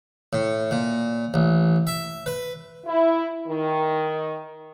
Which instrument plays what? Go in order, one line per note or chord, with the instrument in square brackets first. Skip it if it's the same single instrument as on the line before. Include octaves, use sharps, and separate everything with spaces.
[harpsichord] A2
A#2
A1
E5
B4
[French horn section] E4
D#3